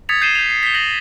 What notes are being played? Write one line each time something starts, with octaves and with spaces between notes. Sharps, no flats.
D#6 G#6 A6 B6 C#7 F7
G6 C7 D#7 E7 G7
G6 F7
C7
B6 G7
G6 A#6 C#7 F#7